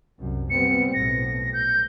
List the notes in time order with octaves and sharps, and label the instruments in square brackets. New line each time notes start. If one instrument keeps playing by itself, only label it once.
[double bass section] C2 F#2
[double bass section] G3 B3 C4 [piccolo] C#7
[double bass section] B1 A2 [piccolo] A#6
[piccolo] G6